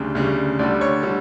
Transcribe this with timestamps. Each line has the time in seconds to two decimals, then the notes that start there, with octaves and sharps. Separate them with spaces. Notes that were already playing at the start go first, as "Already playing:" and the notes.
Already playing: D2 C#3 G3
0.15 D2 C#3 G3
0.59 D2 D3 G3 D5
0.81 C#5
1.03 D3 G3